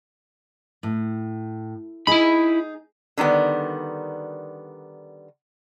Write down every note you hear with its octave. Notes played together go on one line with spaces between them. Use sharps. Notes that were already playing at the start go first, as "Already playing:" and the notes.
A2
D#4 E4 G#4 B5
D3 D#3 G3 B3